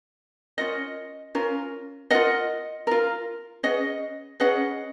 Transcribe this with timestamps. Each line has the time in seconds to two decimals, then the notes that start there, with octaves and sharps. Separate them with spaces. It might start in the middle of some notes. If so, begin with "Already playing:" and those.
0.58 C#4 F4 A#4 D#5 F#5
1.35 C#4 F4 A#4
2.10 F4 A#4 D#5 F#5
2.87 F4 A#4
3.63 C#4 G#4 B4 D#5 F#5
4.40 C#4 G#4 B4 D#5 F#5